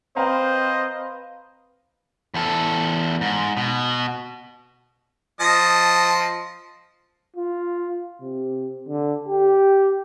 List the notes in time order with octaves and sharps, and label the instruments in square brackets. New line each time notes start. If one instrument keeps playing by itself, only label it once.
[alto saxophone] C4 [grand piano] B4 F5 A#5 [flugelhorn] C5 [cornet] D#5
[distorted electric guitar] E2 A4
G#2
B2
[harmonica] F3 D#5 A5
[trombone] F4
C3
D3
G4